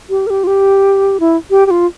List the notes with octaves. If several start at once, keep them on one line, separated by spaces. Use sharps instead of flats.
G4
A#4
G4
F4
G4
E4
G4
G4
F4